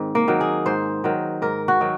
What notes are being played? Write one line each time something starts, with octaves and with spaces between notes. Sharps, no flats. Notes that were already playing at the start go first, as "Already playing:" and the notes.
Already playing: G#2 D#3 C4
A#3
D#3 F#3
G#4
G#2 C5
D#3 F#3
G#2 A#4
F#4
D#3 F#3